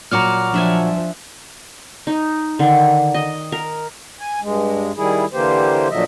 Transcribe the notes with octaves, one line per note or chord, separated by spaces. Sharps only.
A#2 F#3 F#4 A#5 D6 F6
F3 D4 E5 G#5
D#4
D3 D#3
D#5
A#4
G#5
G2 G#3
D#3 G3 E4 G#4
D3 E3 A#3 G4 C5
A#2 D3 F3 F#3 D#5 E5